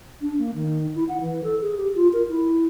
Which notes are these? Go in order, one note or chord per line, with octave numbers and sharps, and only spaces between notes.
D4
A#3
D#3
E4
F#5
E3
A4
G#4
G4
F4
A#4
E4